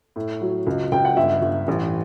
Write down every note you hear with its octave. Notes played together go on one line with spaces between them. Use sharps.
A2
F#3
C#2
C#2 G5
F#5
G1 E5
G1
A1